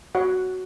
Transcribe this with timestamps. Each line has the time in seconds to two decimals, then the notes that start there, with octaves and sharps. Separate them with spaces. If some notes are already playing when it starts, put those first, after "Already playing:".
0.15 F#4 C#5 F#5